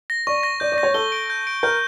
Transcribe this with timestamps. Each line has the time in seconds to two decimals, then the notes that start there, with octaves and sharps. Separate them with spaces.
0.10 A#6
0.27 D5 C#6
0.43 A#6
0.60 D5 G6
0.72 D5
0.78 A#6
0.83 C#5
0.94 A4 G7
1.12 D7
1.30 G6
1.47 D7
1.63 A#4 G6